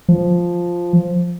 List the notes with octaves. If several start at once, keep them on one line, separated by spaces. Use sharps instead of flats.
F3